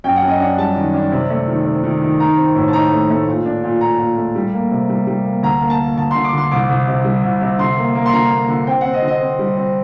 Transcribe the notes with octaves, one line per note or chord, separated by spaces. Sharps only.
F#2 G5
F#5
F#2
D#5
D4 F#5
G3 A5
D#3
D4
C3
A3
D#3
C3
D#3
D#3
D#4 A#5
C4
A2
A5
D#4 A#5
A3
A3
A#2
D4
A#2
A#2 A#5
A#2
A3
G3
A#3
C3
G3
G3
A#3
D2 A#5
A#3
A5
A#3
D2 A5
C6
D3
D6
D3 C6
C2 D6
C2
C3
G3
C2
C3
D3 C6
A#3
A#3
C6
D3 A#5
A#3
D3
C4 G5
F#5
C4
D#5
D3
D#5
C4
G3
C4